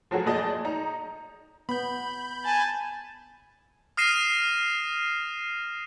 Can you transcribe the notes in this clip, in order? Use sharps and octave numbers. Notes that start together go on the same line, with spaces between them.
F3 F#3 F#4 G#4
F#1 A#2 G#4 D5 D#5 A5
D#4 A#5
B3 B5 G6
G#5 A5
D#6 F6 A#6 C7 D#7 E7